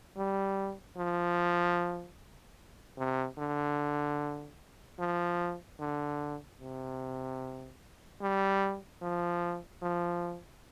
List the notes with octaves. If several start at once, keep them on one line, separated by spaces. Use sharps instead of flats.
G3
F3
C3
D3
F3
D3
C3
G3
F3
F3